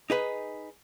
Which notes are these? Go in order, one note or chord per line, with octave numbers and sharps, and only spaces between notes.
D#4 G#4 B4